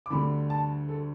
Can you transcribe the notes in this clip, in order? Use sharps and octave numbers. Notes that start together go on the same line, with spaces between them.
D6
D2 D3 G3 B5
A5
A4